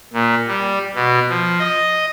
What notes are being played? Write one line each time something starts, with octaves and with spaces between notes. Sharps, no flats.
A#2
G3
B2
F3
D#5